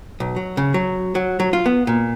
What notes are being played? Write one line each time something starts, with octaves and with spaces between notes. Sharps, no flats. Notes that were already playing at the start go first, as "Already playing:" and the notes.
B1
F#3
C#3
F#3
F#3
F#3
F4
B3
A#2